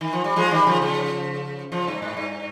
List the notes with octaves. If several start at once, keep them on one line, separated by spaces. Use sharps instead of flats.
D#3
F3
G3
F3 G#3
D#3 G3
C#3 F3
C#3 F3
C#3 F3
G2
G#2
G2